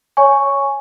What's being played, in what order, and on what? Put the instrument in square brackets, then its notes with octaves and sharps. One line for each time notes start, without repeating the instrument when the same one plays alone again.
[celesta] C#5 G#5 C#6